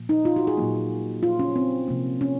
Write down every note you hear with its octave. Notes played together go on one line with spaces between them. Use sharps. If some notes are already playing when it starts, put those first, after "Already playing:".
Already playing: A#2 F3
D#4
F4
F#4
G#4
A#2 F#3 A#3
F4
C#4
C4
C3 F3 A#3
C#4